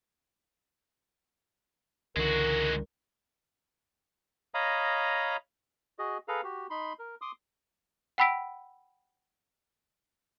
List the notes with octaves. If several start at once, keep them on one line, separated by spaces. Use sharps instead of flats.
C#2 D3 E3 G#3 F#4 A#4
C#5 D#5 F5 A#5 B5 D#6
F#4 G#4 D#5
G#4 A4 B4 F5 A#5
F#4 G4
D#4 B5 C6
A#4
C6 D6 D#6
F#5 G5 B5 E6 B6 D7